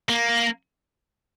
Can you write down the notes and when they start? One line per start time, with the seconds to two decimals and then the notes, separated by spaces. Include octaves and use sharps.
0.09 A#3